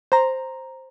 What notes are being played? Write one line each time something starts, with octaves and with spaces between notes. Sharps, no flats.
C5 A#5